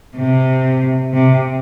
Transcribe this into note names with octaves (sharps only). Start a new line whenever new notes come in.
C3
C3